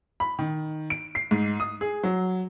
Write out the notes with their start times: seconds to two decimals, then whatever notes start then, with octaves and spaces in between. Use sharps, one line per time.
0.20 B5
0.39 D#3
0.90 D7
1.15 C7
1.31 G#2
1.60 D#6
1.81 G#4
2.03 F#3